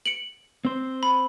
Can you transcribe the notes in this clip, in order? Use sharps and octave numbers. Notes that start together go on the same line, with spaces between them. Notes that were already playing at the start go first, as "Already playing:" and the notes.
C#7 D7 F#7
C4 C5
B5